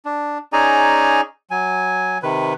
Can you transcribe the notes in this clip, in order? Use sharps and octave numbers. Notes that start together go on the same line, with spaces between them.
D4
C#4 D#4 G#4 D5 G#5 A#5
F#3 G#5
C3 D#3 B4